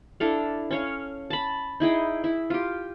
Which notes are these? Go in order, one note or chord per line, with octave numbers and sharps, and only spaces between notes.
D4 E4 A4 F5
C#4 C#5 F5
A5 B5
D#4 E4 G#4 G5
E4
F4 G4